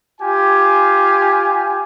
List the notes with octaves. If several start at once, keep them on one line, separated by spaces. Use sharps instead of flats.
F4 G4 G#5